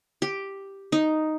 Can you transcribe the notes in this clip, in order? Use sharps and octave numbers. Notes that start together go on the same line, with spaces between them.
G4
D#4